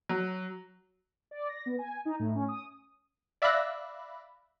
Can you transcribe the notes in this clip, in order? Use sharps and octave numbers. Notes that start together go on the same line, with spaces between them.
F#3
D5
A#6
B3
G#5
D#4
A2
C#4
D#6
D5 E5 F5 B5 F#6 A#6